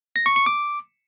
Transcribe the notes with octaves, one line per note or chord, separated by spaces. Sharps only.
A#6
C#6
C#6
D6